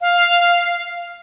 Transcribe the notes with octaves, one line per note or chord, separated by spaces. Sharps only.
F5